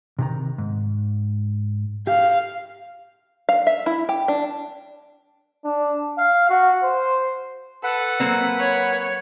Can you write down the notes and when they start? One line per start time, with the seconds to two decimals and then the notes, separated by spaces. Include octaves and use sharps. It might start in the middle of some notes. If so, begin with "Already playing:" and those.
0.19 C3 D#3 A#5
0.58 G#2
2.07 G4 F5
3.49 F5
3.67 E5
3.86 E4
4.09 G4
4.28 D4
5.65 D4
6.18 F5
6.50 F#4
6.84 C5
7.84 A4 B4 F#5
8.20 F#3 A#3 C4
8.60 C#5